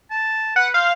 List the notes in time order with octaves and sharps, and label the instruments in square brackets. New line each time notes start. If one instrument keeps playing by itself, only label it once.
[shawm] A5
[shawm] B4 [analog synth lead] F#5
[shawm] C5 [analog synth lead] F5